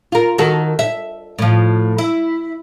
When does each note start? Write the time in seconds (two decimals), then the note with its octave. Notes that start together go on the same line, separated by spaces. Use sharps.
0.12 F4 A#4
0.38 D#3 F#4 A4
0.79 E5
1.39 A2 F3
1.98 E4